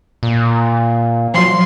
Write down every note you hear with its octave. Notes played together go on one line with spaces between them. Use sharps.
A#2
F3 F#3 C6